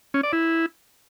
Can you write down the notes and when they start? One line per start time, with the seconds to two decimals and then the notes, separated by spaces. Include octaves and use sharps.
0.14 C#4
0.23 D5
0.33 E4